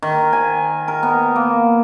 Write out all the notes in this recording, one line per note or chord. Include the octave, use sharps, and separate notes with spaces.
D#3
G#5
A#4
B3
A#3